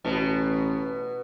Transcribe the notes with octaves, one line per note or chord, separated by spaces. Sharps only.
A1 B2